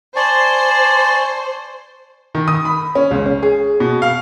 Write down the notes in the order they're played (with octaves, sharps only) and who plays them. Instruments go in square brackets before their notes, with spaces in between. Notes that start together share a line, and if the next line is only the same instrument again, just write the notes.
[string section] C5 [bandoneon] D5 [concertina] G#5 A5 C#6
[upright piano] D#3
D#6
B5
C#4
C#2
C#4
G#4
B2
F5